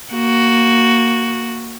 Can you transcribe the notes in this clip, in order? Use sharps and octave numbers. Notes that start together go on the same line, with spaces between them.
A#3 F#4